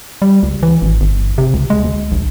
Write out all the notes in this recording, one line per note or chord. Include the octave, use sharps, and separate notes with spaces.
G3
C#2
E3
G#1
G1
C3
C#2
G#3
D2
A#1